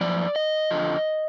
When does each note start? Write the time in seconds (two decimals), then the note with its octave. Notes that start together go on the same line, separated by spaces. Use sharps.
0.01 F#2 F3 D5
0.36 D#5
0.71 F2 D3 F3